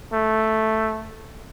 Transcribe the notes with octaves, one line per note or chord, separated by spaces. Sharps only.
A3